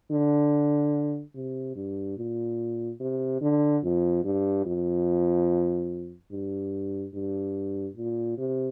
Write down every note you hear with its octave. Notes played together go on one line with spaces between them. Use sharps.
D3
C3
G2
A#2
C3
D3
F2
G2
F2
G2
G2
A#2
C3